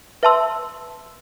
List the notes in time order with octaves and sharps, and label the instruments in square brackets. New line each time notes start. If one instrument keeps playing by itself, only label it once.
[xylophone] B4 E5 A5 C6 E6